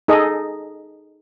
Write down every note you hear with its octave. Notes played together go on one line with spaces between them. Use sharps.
D#4 G#4 A4 D#5